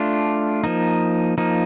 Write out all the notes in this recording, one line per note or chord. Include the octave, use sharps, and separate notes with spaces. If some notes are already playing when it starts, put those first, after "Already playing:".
Already playing: A3 D4 F4
F3 A#3 D#4
F3 A#3 D#4